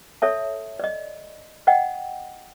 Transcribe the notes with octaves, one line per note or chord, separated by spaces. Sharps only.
A4 C#5 E5 A5
D5 D#5
D#5 F#5 G5